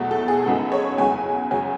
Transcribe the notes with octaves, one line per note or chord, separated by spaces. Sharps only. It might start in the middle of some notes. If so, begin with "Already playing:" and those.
Already playing: E2 B2 F#3 A3
A4
G#4
F#2 C#3 F#3 B3 D#4 A4
C#5
E2 C#3 F#3 G#5
F#2 C#3 F#3 C#4 G#5